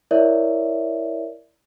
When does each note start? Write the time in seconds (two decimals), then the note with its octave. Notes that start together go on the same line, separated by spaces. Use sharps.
0.11 E4 A#4 C#5 D5 E5